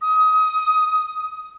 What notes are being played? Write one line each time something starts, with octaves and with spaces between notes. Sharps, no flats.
D#6